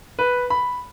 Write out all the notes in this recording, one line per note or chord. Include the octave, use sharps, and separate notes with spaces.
B4
B5